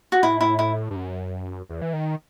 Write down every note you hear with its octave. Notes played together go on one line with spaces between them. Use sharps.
F#4
A2 E4
E4
E4
G2
F#2
E2
E3
D#3